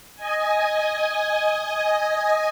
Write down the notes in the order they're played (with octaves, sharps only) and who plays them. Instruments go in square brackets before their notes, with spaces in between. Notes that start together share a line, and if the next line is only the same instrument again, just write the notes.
[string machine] D#5 G#5